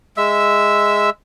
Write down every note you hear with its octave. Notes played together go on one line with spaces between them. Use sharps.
G#3 E5 E6